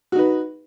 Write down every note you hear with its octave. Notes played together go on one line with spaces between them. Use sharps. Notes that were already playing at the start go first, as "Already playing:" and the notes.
D#4 F#4 B4